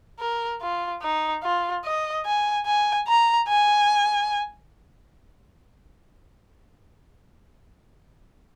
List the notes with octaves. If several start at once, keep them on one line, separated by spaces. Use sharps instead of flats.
A#4
F4
D#4
F4
D#5
G#5
G#5
A#5
G#5